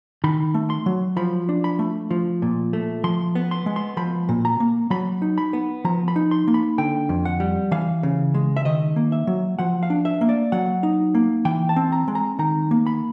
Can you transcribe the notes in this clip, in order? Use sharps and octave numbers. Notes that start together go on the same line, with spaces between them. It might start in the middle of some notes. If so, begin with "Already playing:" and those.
D#3 B5
A3
C6
F#3
F3 B5
D4
B5
A3
F3
A#2
A3
F3 C6
B3
C6
G#3
C6
F3 B5
A#2
A#5
A#3
F#3 B5
D#4
B5
B3
F3 A#5
B5
D#4
C6
A#3
B5
D3 G5
F2
F#5
G3
E3 F5
C#3
G#3
E5
D#3 D#5
A#3
E5
F#3
F3 F#5
F5
D4
E5
A#3
D5
F#3 F#5
D#4
A#3
E3 G5
A5
C4
A#5
G#3
A#5
D#3 A#5
A#3
B5